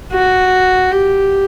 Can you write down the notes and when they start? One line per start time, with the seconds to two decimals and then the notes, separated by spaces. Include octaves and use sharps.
0.13 F#4
0.92 G4